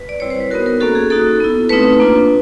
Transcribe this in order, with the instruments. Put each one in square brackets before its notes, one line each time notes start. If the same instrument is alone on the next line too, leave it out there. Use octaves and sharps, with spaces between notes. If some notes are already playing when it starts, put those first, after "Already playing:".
Already playing: [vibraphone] B4
D5
G3 C4 E4 C#5
C5
B4
B3 D#4 F#4 A#4
A#4
A#3 C#4 F#4 A4
G#4
A#3 D#4 F#4 A4
B3 E4
A3 C4 D#4 B4
A#3 D4 F4